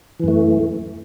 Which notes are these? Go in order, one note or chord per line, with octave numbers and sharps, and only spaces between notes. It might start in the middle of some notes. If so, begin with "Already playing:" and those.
F#2 E3 A3